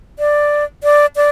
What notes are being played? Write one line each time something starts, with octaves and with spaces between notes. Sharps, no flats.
D5
D5
D5